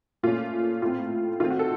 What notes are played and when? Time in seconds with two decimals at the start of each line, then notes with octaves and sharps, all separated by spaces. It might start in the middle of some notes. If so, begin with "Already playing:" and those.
0.23 A#2 A3 C#4 F4
0.82 A2 A3 C4 F4
1.40 D#3 A3 C4 F4
1.50 F#4
1.59 A4